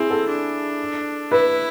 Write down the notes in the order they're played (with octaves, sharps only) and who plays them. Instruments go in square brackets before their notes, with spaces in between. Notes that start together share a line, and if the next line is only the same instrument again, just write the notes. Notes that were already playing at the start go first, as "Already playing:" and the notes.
Already playing: [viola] C4 [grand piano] E4 G#4
[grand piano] A4
[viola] D4
[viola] E4 [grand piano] B4